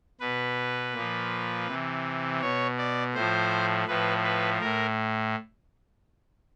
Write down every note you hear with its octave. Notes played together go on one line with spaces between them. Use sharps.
B2 B4
A#2 F3
C3 E3
B2 C#5
D5
A2 F3 C5
A2 F3 B4
B4
A2 A#4